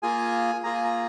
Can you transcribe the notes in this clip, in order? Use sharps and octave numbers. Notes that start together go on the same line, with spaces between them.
A#3 F4 G#4 G#5
A#3 F4 G#4 A#5
G#5
A#5